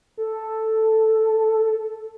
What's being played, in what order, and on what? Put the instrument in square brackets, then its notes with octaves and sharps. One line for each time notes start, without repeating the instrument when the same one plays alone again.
[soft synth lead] A4